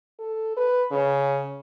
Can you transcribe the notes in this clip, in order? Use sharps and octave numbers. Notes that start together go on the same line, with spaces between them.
A4
B4
C#3